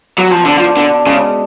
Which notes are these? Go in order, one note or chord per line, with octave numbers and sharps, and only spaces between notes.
F#3 B3
F3
D3 D4
F3
B2 D3
C#3 G#3